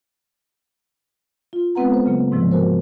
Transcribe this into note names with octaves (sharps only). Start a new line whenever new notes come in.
F4
G#3 B3 C4 B4 F#5 A#5
A4 C5
C#3 F#3 A#3
G#2 C3 F3 G#3
F#4 A#4 C5